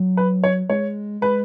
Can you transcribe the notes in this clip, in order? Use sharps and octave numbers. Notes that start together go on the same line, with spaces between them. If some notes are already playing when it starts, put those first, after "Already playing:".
Already playing: F#3
B4
C#5
G#3 C#5
G#3 B4